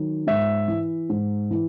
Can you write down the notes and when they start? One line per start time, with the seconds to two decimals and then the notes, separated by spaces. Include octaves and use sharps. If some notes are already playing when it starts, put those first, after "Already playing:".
Already playing: D#3 F#3
0.27 G#2 E5
0.68 E3
1.09 G#2
1.51 E3